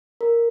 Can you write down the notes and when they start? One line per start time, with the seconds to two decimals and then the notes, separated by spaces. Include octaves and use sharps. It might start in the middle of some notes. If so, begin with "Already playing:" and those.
0.21 A#4